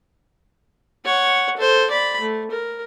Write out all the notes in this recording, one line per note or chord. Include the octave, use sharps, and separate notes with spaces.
C#5 F#5
A4 C5
D5 B5
A3
A#4